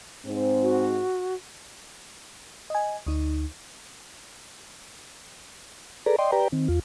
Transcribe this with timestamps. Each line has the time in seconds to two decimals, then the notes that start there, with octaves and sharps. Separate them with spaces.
0.24 G#2 C4
0.62 F#4
2.70 D#5 G#5
3.07 D2 D#4
6.06 G#4 A4 B4 D5 A#5
6.18 D5 D#5 G5 C6
6.32 G4 B4 D5 G5 A#5
6.52 D#3 C4
6.68 E2 F4